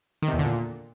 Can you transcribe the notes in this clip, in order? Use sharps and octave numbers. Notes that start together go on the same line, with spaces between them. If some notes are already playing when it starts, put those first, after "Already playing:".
D#3
C3
E2
D3
A#2